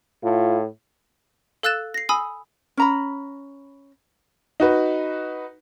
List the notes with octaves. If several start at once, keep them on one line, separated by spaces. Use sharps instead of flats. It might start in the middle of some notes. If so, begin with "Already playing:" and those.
A2 F4
A4 F5 E6 F#6 A6 E7
A#6 C7
G#5 B5 D#6 E6
C#4 A#5 B5
D#4 F#4 B4